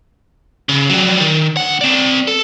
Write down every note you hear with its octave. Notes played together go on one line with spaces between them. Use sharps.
C#3
F#3 G3
D#3
D2 F#5
C4 D5
A4